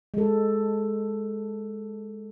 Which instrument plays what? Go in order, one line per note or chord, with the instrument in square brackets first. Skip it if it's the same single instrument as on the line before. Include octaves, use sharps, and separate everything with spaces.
[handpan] G#3 A4